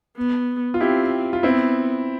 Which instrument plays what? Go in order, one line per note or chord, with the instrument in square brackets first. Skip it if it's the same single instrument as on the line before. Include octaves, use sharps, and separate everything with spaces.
[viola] B3
[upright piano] F4
[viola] C4 [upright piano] E4 G4
[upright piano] F4
[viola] B3 [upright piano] C4 E4